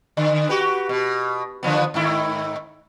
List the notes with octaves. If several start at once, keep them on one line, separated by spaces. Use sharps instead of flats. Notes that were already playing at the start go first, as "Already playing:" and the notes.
D3
F#4 G4 B4
B2
D3 F3 B3
G#2 D#3 E4